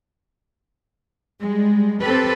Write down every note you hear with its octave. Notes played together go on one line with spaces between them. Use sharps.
G3 G#3
C4 G4 A4 B4